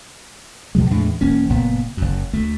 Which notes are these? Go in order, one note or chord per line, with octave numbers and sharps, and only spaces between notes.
G2 B2 F#3 G#3
E2 A2 G#3 D4
E1 A#3 C#4
F#1 A#2 B3
F#1 F#2
D2 A3